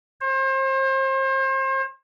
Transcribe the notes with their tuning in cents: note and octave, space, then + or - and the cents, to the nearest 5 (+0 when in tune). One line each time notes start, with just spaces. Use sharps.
C5 +35